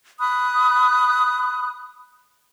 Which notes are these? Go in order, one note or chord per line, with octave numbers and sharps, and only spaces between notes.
B5 D#6 F#6